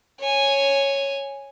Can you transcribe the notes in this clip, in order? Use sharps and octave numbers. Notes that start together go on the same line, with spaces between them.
C#5 G#5